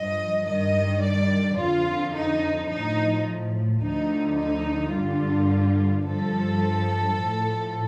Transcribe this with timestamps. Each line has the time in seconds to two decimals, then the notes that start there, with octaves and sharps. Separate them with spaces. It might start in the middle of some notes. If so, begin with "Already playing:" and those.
Already playing: G2 F3 D#5
0.47 G2 D#3 G3 D#5
1.01 D5
1.58 F2 D3 F3 F4
2.14 D#4
2.69 A2 F3 D#4
3.81 D2 D3 F3 D#4
4.37 D#4
4.93 G2 D3 G3 F4
6.04 G2 F3 A4
7.16 A2 F3